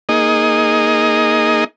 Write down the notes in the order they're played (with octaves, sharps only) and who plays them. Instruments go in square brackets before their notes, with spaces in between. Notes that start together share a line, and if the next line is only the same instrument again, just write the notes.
[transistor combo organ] A#3 D#4 G#4 D#5